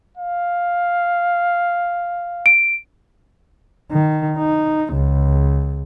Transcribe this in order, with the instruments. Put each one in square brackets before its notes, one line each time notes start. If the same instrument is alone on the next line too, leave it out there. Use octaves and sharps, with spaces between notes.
[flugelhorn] F5
[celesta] D7
[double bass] D#3
D#4
C#2